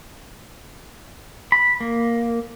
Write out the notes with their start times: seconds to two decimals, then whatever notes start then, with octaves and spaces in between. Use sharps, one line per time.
1.52 B5
1.80 A#3